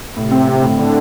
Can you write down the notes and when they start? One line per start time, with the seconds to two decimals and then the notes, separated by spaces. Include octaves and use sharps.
0.16 A2 C3
0.31 C4
0.48 C4
0.63 A2 D3
0.78 A2